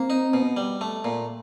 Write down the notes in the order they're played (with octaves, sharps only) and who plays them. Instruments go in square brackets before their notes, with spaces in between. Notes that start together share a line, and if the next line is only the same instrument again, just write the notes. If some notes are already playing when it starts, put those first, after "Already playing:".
Already playing: [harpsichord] A#3 [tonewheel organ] C4
[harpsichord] D#4
B2
G3
A3
A#2